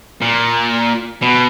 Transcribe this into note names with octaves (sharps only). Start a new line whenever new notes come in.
A#2
B2